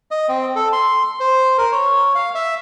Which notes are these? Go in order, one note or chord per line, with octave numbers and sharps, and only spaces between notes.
D#5
C4
A4
C6
C5
A#4
C#5
F5
E5